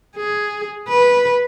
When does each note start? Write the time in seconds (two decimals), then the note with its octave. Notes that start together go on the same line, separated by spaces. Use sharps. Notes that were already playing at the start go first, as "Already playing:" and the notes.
0.16 G#4
0.89 B4